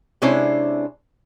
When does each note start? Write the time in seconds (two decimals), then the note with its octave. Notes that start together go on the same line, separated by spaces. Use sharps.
0.22 C3 G#3 C#4 D4 E4 C5